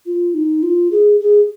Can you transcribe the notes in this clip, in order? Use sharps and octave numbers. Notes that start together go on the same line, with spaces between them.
F4
D#4
F4
G#4
G#4